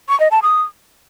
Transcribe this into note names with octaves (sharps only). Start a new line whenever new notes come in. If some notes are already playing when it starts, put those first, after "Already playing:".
C#6
D#5
A5
D#6